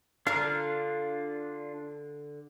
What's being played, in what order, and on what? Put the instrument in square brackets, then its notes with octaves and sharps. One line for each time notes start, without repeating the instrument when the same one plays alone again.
[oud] D3 A#4 [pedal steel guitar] D4 F4 F5